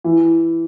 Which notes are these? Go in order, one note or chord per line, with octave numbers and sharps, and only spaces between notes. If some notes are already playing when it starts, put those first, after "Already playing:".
E3